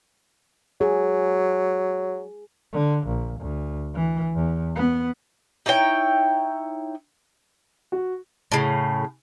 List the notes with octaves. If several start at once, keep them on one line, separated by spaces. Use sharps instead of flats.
F#3 G#4
D3
A#1
D2
E3
E2
B3
D#4 E4 C#5 G5
F#4
A2 C#3